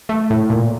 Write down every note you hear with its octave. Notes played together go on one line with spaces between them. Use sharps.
A3
A2
A#2